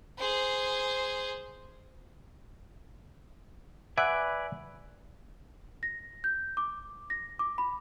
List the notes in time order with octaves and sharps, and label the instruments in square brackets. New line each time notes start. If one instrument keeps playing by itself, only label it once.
[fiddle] G#4 C5
[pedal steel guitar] B4 D5 G#5 [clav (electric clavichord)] E5 F#5
[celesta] A#6
G6
D6
A#6
D6
B5